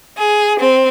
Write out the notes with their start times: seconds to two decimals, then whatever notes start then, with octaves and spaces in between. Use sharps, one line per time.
0.17 G#4
0.59 C4